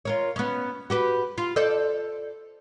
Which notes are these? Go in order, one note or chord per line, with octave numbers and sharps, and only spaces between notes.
F4 A#4 C#5
B3 C#4
F#4 G4 B4
F4
A4 C5 D5